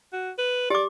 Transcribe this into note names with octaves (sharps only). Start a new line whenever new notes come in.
F#4
B4
G4 D5 D6